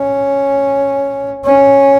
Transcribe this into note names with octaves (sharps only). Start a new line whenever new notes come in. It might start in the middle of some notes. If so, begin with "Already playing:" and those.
Already playing: C#4
C#4